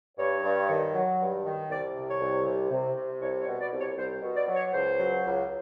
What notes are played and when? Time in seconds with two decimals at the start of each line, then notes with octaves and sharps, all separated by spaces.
0.18 G2 C#5
0.43 G2
0.68 D#3
0.93 F#3
1.19 G2
1.44 D#3
1.69 C2 D5
1.95 C3
2.08 C#5
2.21 C2
2.45 C3
2.71 C3
2.96 C3
3.21 C2 C#5
3.40 C#5
3.47 B2
3.60 D5
3.72 C2
3.79 C#5
3.98 C2 C5
4.22 B2
4.36 D5
4.48 F#3
4.54 C#5
4.73 C#2 C5
4.98 F#3
5.24 C#2